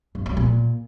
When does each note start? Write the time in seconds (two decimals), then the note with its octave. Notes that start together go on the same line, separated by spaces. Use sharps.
0.15 G2
0.26 F#3
0.37 A#2